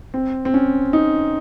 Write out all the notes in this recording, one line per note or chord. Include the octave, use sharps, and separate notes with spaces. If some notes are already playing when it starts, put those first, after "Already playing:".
C4
C4
C#4
D#4